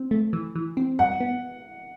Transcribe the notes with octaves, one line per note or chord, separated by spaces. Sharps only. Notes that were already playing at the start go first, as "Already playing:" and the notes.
Already playing: C4
A3
E3
E3
C4
G2 F#5
B3